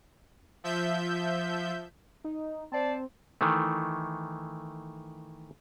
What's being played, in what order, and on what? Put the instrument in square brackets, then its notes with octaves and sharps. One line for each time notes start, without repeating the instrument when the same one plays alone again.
[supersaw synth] F3 E5 G6
[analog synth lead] D#4
[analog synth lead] C4 [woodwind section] C5 D5 A5
[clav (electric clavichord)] D#3 E3 A3